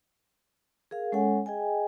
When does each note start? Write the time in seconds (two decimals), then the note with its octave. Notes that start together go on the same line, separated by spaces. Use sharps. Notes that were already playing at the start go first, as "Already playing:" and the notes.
0.91 G#4 A#4 F5
1.12 G#3 C#4 A4 C#5 F#5 G#5
1.46 G#4 D#5 G5 G#5